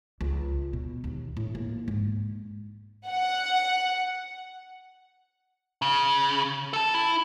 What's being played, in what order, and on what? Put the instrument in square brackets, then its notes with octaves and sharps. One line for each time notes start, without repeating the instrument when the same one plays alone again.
[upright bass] C#2
B2
D#2
A2
A#3
G#2
[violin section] F#5
[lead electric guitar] C#3
A4 A5
E4